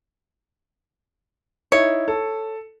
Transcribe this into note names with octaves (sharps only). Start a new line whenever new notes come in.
D#4 E4 C#5
A4